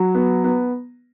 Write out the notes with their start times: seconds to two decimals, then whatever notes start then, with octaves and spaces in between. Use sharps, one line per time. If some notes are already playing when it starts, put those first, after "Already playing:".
Already playing: F#3
0.15 B3
0.44 B3